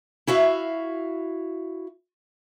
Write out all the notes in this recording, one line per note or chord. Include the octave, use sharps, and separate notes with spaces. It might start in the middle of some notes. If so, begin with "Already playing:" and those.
E4 F#4 E5 F5